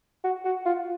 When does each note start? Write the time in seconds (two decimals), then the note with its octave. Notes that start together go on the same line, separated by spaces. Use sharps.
0.24 F#4
0.45 F#4
0.66 F4